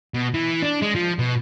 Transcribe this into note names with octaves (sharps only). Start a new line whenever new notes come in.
B2
E3
D4
G#3
F3
B2